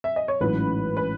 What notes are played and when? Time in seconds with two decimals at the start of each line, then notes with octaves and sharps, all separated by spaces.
0.04 E5
0.16 D#5
0.28 C#5
0.41 A1 G#2 F#3 C#4 B4
0.97 B4